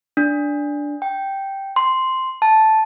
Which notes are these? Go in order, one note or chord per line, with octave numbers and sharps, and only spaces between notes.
D4
G5
C6
A5